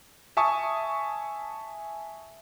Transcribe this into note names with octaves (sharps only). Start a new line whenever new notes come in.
E5 G#5 A5 C#6 D#6